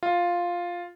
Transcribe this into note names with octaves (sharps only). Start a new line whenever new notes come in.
F4